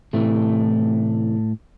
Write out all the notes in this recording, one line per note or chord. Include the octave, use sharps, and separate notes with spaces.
A2 C3 E3 A3